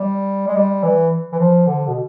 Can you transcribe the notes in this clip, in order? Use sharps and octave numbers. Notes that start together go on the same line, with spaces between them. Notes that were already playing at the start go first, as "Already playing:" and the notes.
Already playing: G3
G#3
G3
E3
E3
F3
D3
B2